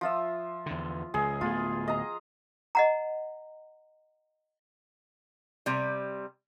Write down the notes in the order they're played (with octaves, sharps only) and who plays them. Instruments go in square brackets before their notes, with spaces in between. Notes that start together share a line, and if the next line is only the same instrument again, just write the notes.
[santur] F3 F4 E5
[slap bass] E2 D3
[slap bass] C#2 [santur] G#4
[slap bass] D1 A3 B3 [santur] F4
[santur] D#5 A#5
[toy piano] D#5 F#5 A#5
[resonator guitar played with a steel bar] C3 G3